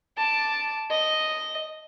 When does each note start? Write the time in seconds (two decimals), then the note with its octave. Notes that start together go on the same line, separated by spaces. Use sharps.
0.18 A5 D6
0.91 D#5